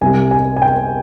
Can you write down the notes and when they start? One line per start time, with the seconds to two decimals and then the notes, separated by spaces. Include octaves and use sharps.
0.01 C2 C3 G3 G#5
0.31 G#5
0.56 G#5
0.62 G5